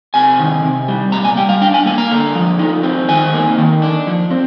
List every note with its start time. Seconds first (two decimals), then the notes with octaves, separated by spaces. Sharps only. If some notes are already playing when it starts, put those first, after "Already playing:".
0.14 C3 G#5
0.39 D#3
0.63 C3
0.88 G3
1.12 A#2 A#5
1.25 G#5
1.37 G3 G5
1.49 F5
1.61 D4 G5
1.74 G#5
1.86 A#3 G#5
1.98 A#5
2.11 D3
2.35 F3
2.59 D#4
2.83 C4
3.08 D#3 G#5
3.33 A#3
3.58 D#3
3.82 D4
4.07 F3
4.31 C4